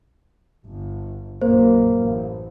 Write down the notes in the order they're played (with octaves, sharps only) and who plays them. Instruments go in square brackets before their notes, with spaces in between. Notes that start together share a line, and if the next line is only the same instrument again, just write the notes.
[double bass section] G1
[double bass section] A#1 F#2 A#2 [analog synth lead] A#3 [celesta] C5
[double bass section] A1